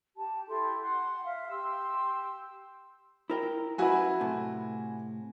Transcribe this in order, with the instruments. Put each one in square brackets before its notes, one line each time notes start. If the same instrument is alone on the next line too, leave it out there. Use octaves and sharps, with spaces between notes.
[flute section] G4 A5
E4 G4 A4 C6
F#5 C6
E5 F5
G4 C6 E6
[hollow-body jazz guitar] E4 A#4 G5
[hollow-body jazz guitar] F#2 B4 [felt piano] E4 F#4 G#5
[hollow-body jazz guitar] A2 C3